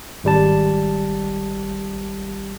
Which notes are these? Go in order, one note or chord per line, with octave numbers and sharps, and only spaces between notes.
G#1 G3 A5